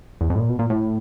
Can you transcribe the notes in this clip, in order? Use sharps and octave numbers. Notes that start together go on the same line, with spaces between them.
E2
F2
A2
A#2
B2
A#2
A2